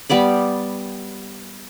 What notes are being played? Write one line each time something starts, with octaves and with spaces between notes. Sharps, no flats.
G3 B3 D5 B5